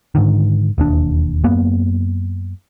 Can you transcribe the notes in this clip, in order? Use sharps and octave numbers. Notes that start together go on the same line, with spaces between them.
G#2 D3 D#3
E1 D#2 D4
F#2 A#3 B3